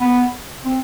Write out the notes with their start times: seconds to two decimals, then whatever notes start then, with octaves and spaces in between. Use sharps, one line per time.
0.01 B3
0.65 C4